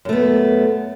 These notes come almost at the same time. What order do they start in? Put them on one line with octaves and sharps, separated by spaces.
F#2 A3 B3